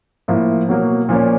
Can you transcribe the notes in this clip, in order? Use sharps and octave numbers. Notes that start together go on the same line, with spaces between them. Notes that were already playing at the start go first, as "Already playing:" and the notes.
A2 F3 A#3
B2 F#3 A#3
A#2 F3 A#3 C#4